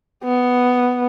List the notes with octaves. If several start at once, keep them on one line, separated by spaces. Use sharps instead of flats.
B3